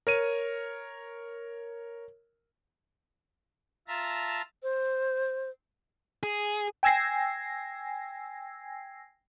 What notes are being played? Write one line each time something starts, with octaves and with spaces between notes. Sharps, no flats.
A#4 C#5 D#7
F4 E5 A5 A#5
C5
G#4
G5 G#5 E6 G#6 A#6 C7